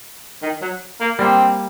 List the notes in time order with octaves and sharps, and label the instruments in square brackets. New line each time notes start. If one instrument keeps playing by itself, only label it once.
[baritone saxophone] D#3
F#3
A#3
[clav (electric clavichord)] G3 A#3 [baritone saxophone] C4